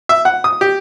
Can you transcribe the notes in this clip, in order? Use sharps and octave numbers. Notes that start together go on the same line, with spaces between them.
E5
F#5
D#6
G4